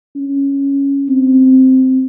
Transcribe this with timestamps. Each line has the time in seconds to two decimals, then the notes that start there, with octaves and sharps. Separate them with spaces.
0.16 C#4
1.09 C4